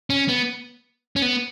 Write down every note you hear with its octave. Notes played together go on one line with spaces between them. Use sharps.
C#4
B3
C#4
B3